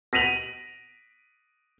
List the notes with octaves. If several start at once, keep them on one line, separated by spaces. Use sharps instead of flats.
A#6 B6 D#7 F7 F#7